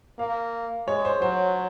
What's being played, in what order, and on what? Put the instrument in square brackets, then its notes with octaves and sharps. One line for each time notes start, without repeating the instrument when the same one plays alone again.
[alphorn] A#3 [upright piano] F5
[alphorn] G#3 [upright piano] C#5
[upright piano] C5
[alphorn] F#3 [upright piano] C5